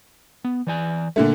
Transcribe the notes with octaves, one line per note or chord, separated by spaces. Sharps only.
B3
E3 D5 G#5
A#2 D3 A3